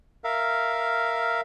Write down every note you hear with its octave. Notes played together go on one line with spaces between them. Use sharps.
A#4 E5 F5